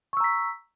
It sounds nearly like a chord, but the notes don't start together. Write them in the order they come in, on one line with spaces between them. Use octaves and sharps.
C#6 E6 A#5 B6